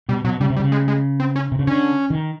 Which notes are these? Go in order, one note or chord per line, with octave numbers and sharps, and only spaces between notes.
B2 G3
B2 F#3
C#3 G3
C3
G3
C#3
G#3
G#3
C4
C#4
C3
C#3
D3 C#4
D#3